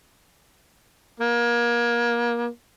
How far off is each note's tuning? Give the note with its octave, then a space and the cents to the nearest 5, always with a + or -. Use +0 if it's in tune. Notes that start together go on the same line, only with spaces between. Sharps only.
A#3 +30